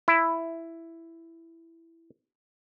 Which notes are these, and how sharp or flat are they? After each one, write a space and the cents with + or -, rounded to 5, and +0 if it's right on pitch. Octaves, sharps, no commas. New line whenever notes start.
E4 +5